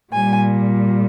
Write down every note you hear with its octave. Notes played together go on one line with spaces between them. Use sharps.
A#2 G3 G#5